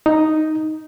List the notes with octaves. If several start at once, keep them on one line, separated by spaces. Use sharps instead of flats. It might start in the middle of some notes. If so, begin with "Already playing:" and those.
D#4